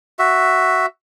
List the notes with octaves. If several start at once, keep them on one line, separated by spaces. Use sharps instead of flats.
F#4 E5